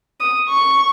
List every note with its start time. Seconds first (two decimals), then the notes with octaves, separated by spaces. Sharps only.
0.20 D#6
0.49 C#6